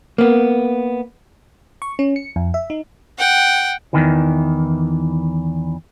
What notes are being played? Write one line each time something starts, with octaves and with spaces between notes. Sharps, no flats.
A#3 B3
C#6
C#4
C#7
F2
E5
D#4
F#5 G5
E2 D#3 E3